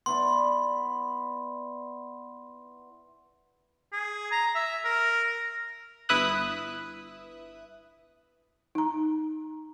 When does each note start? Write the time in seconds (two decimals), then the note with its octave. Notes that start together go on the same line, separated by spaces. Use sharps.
0.06 B3 E4 D5 C6
3.93 G#4
4.32 A#5
4.55 E5
4.85 A#4
6.09 G1 E4 B4 E5 D#6 F#6
8.75 D#4 A#5